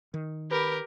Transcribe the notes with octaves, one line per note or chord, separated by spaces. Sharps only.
D#3
G4 A#4 B4